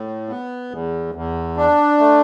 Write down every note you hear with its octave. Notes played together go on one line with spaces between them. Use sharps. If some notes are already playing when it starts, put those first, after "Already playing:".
Already playing: A2
B3
E2
E2
D4
A3